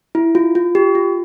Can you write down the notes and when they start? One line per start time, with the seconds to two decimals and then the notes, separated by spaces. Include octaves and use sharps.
0.15 E4
0.35 F4
0.55 F4
0.75 G4
0.95 F4